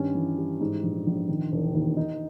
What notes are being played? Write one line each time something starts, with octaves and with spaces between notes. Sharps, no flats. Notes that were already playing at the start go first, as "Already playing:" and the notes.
Already playing: G2 D#3 C#4
E3
G3
G#2
A#1
A#1
D#3
E1
D#2
D#4